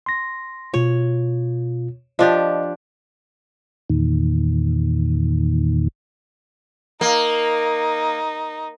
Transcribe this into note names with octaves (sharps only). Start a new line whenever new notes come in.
C6 A#6
B2 F4 C#5
F3 D4 G4 D#5
E2 A#2 D#3
A#3 D#4